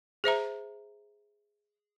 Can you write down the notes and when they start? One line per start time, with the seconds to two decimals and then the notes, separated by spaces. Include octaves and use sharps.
0.24 G#4 C5 E5 A#5